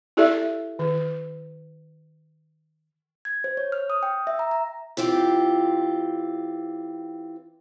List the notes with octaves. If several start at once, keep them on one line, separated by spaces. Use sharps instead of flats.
E4 G4 A4 D5 E5
D#3
G#6
C5
C#5
F6
D#6
G5
E5
A#5
A#5
E3 C4 F4 G4